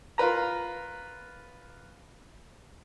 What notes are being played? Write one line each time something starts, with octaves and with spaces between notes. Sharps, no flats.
F4 A#4 B4 A#5